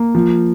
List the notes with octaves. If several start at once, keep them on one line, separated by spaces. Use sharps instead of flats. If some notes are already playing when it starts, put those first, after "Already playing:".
Already playing: A#3
F3